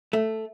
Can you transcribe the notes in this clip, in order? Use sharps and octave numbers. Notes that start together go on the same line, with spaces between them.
A3